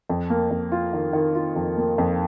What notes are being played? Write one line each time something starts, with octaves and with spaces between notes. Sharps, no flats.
F2
A#3
F2
F4
D#3
D#3
F4
F2
A#3
F2